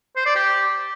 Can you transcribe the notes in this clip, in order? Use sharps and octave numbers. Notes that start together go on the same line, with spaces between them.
C5
D5
G4